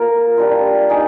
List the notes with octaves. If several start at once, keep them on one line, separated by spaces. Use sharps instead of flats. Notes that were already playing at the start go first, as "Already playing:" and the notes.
Already playing: A#3 F4 A#4
G3 D4 F4
D#4 G#4 D5